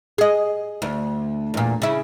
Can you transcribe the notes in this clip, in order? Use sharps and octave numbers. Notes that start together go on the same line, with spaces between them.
G#4 D#5
D2
E2 A#2
C#3 E4